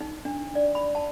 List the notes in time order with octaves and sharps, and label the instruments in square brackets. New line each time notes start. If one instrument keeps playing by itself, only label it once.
[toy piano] D#4
D4
D5
B5
A5